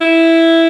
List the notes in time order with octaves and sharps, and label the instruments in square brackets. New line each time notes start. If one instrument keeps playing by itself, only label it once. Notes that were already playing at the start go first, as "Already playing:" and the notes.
[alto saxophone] E4